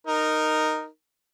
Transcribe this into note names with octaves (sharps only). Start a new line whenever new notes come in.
D#4 A#4